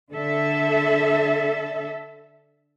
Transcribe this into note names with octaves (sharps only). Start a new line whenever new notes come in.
D3 A4 E5